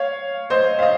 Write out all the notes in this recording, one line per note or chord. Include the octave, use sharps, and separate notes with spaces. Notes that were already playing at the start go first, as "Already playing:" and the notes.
Already playing: C#5 F5
C5 D#5
F5
D#5